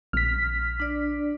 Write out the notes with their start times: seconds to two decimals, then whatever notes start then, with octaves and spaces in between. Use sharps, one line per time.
0.13 A#1 F6 B6
0.80 D4 D5